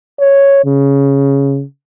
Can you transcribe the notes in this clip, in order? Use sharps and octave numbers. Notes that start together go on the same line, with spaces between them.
C#5
C#3